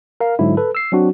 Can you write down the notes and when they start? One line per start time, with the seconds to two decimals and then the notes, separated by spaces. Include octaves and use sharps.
0.20 A#4 F5
0.39 G#2 D3 F#3 E4
0.57 A4 B4
0.75 E6 C7
0.92 F#3 C4 D4 F#4